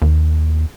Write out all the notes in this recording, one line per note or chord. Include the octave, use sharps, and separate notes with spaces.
D#2